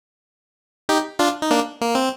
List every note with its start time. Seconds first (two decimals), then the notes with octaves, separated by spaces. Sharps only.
0.89 D#4 G4
1.19 D4 F4
1.42 D#4
1.51 A#3 D4
1.81 A#3
1.95 C4